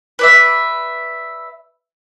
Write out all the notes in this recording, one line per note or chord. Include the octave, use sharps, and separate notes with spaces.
B4 D5 E5